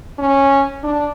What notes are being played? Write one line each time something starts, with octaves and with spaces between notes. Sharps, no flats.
C#4
D4